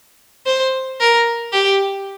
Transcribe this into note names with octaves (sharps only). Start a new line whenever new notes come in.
C5
A#4
G4